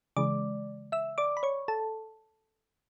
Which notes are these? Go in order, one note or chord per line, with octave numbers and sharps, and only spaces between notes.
C#3 E3 G#3 D5 D6
E5 E6
D5 D6
B5
C#5 C#6
A4 A5